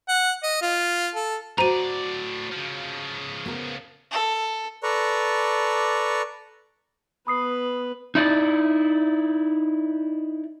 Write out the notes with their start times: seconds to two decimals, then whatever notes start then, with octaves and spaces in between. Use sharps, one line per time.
0.09 F#5
0.43 D#5
0.62 F4
1.15 A4
1.58 A2 F#4 C5 D5 A#5 D#7
2.52 C#3 F3
3.46 B3 A#4
4.12 A4
4.83 A4 B4 D5 A#5 C#6
7.27 B3 B4 B5 D#6 C7
8.15 D#4 E4 D5